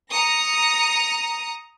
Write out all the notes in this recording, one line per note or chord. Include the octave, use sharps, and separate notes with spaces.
A#5 D#6 A#6 C#7